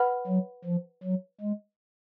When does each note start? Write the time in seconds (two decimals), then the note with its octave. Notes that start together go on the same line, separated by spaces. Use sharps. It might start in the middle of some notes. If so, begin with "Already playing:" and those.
Already playing: B4 F#5 B5 F6
0.27 F#3
0.65 F3
1.03 F#3
1.40 G#3